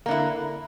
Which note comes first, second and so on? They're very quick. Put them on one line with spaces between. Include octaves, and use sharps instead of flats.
A#3 D3 E4